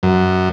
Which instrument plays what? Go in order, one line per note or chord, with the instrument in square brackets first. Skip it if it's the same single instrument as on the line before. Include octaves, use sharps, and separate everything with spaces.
[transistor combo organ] F#2